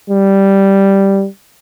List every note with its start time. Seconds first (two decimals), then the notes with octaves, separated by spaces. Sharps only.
0.10 G3